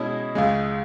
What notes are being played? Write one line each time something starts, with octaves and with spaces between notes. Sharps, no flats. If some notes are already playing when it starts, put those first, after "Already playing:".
Already playing: B2 G#3 C#4 E4 D#5
C#2 C#3 G#3